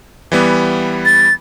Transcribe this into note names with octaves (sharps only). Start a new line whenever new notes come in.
E3 G3 B3
A6